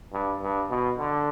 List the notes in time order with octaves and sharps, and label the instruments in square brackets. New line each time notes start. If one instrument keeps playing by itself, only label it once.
[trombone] G2
G2
B2
D3